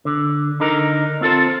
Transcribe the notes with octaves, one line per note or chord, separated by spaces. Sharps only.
D3
D3 D#4 A#4
C4 F4 A4 C5